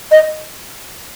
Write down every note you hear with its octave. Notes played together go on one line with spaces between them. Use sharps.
D#5